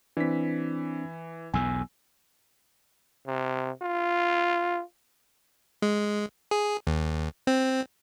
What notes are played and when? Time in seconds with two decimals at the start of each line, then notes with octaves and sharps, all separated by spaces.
0.17 E3 C4 D4 B6
1.54 B1 E2 B2 G#5 E6
3.27 C3
3.83 F4
5.82 G#3
6.51 G#4
6.87 D#2
7.47 C4